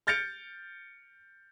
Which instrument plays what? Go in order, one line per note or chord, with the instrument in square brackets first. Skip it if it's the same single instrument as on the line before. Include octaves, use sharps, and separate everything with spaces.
[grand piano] F6 G6 A6 C#7 D7 F7